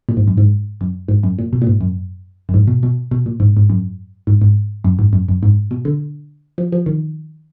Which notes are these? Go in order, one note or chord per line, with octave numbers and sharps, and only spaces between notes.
A#2
G#2
F#2
G#2
F#2
G#2
F#2
A#2
B2
A#2
G#2
F#2
F#2
G#2
B2
B2
B2
A#2
G#2
G#2
F#2
G#2
G#2
F#2
G#2
F#2
F#2
G#2
B2
D3
F3
F3
D#3